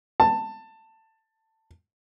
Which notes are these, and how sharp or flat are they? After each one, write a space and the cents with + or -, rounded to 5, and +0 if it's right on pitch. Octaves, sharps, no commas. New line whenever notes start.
A5 +15